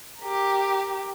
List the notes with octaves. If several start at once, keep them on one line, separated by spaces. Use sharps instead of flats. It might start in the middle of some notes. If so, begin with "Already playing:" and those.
G4 A#4